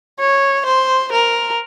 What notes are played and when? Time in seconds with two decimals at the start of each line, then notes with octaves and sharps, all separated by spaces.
0.20 C#5
0.66 C5
1.12 A#4